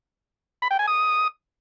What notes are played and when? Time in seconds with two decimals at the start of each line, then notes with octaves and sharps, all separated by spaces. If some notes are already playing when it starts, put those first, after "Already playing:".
0.62 B5
0.71 G5
0.79 G#5
0.88 D#6